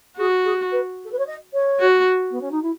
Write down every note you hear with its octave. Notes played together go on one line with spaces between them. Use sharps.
F#4 G#4
G#4
B4
A4
B4
C#5
D#5
C#5
F#4
B3
C#4
D#4
E4